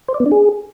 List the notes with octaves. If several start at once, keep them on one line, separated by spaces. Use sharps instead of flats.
C5
D5
B3
D4
G#4